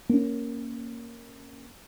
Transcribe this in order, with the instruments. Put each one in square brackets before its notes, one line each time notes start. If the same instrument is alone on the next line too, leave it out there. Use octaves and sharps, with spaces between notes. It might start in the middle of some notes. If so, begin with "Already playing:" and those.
[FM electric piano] A#3 C#4